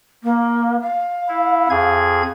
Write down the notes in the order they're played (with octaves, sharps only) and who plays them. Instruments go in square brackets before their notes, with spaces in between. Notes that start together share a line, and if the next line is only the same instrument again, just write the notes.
[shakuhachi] A#3
F5
[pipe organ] E4
F2 G#4 G#6